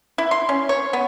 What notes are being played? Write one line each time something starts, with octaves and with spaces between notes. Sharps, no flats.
E4
C6
C#4
C#5
B3